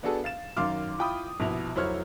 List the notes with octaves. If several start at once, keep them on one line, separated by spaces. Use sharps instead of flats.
B3 D4 F#4 G#4 A4
F5 A6 E7
F#2 D#3 F5 C6 D6 F6
E4 F4 G5 B5 D#6
A#1 B2 E4 F7
F1 F#3 E4 C5 C#5 F6